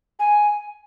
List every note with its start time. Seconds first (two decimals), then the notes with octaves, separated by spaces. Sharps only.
0.20 G#5